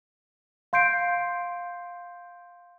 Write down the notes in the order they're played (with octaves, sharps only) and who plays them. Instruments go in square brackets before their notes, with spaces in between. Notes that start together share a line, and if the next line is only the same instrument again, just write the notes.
[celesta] F5 C6 G6 C7 D7